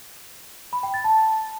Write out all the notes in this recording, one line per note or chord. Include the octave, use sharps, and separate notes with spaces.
B5
G5
A6
A5